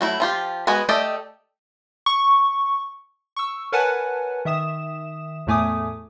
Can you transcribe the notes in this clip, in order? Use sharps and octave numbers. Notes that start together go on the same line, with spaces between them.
F#3 A3 E4
F3 F4 G4
G#3 B3 F#4 B4 G#5
A3 G4 A4 D5 D#5
C#6
C#6 E6
A#4 B4 C#5 F#5 G#5 A5
D#3 E5 D#6 E7
E2 A2 A3 G#5 D6 D#6